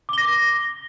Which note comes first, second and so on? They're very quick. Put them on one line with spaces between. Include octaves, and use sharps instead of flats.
D6 G7 A#6